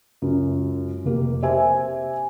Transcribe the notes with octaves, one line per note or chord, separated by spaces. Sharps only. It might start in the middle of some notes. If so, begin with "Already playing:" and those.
C#2 F#2
F1 A#3 G4
G4 C5 E5 G#5